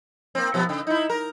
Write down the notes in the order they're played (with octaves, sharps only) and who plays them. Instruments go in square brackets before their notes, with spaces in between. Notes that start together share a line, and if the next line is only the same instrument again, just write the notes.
[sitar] A#3 C4
B2 F3 B3
C#3
D#4 E4
A#4